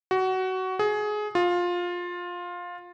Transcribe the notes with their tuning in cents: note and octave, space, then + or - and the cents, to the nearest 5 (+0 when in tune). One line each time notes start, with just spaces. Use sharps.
F#4 +20
G#4 +20
F4 +15